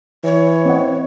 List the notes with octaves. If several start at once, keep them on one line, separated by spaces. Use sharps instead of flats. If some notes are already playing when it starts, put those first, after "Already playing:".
E3 C#5
C4 D#5 F#5